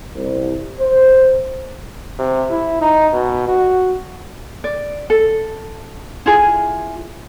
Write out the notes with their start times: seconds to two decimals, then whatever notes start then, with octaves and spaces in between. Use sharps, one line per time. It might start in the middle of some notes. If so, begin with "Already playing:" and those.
0.14 C2
0.79 C5
2.19 C3
2.51 E4
2.81 D#4
3.13 B2
3.48 F#4
4.64 D5
5.10 A4
6.26 E4 F4 G#4